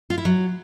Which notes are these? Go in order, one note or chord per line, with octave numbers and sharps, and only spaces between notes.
F4
E4
F#3